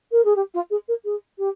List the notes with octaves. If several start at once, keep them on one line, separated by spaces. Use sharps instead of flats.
A#4
G#4
G4
F4
G#4
A#4
G#4
G4